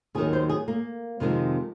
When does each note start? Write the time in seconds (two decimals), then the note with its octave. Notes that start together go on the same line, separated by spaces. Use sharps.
0.15 D#2 G#4
0.18 D#3 F#3
0.33 C5
0.49 G#4
0.68 A#3
1.20 F2 C3 D#3 G#3